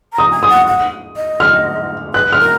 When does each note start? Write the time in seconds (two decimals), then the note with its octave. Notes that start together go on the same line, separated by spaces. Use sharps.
0.13 A#5
0.18 D#6
0.31 G#5
0.43 D#6
0.49 F#5
0.67 F#5
1.16 D#5
1.40 F6
2.14 B4 F#6
2.32 F6
2.39 A#4